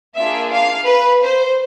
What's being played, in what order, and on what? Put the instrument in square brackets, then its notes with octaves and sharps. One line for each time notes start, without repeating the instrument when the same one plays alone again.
[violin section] A#3 D4 F4 G#4 E5
F5
B4
C5